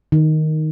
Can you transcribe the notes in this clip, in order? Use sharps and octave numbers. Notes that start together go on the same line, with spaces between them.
D#3